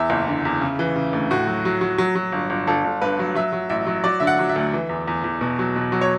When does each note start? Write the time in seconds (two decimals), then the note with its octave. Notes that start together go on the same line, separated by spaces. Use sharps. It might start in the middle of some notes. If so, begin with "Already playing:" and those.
Already playing: E2 E5
0.10 F#1
0.28 D3
0.45 E2
0.61 C#3
0.79 E3
0.95 C#3
1.13 D2
1.30 A2 F#4
1.47 F#3
1.65 F#3
1.81 F#3
1.98 F#3
2.15 F#3
2.32 G1
2.50 G1
2.67 G1 A4
2.84 G1
3.02 G2 B4
3.19 F#3
3.35 F#3 E5
3.53 F#3
3.69 A1 E5
3.87 F#3
4.04 F#3 D5
4.20 D3 E5
4.27 F#5
4.39 F#3
4.49 E5
4.56 D2
4.73 E3
4.89 E2
5.08 E2
5.24 E2
5.41 B2
5.59 F#3
5.76 B2
5.92 F#3
6.01 C#5